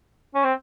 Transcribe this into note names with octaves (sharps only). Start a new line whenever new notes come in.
C#4
C4